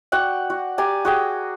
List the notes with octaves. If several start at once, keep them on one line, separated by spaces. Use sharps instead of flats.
F#4 D5 F#5 G5
F#4
G4 D5 G#5 A#5
F#4 G#4 G5